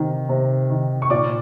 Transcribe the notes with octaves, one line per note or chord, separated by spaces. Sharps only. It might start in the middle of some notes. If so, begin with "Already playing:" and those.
Already playing: C3 D#3
C3
D#3
C#6
A#2 D5 D6